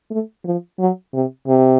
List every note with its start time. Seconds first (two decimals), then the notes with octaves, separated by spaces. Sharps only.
0.10 A3
0.45 F3
0.79 F#3
1.13 C3
1.47 C3